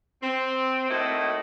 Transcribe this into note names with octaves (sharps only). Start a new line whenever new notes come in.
C4
A2 A3 A#3 D#4 E4 F#4